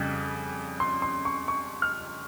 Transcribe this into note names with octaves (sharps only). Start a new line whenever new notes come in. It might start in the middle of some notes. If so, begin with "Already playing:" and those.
Already playing: F2 C#3 G3
C6
C6
C#6
C#6
F6